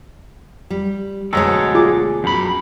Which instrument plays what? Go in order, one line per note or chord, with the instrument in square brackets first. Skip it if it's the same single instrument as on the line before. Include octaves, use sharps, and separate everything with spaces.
[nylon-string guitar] G3
[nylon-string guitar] D2 B2 C#5 [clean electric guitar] F#3 G#3 A4
[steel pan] F4 G#4 D6
[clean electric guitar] F#2 B5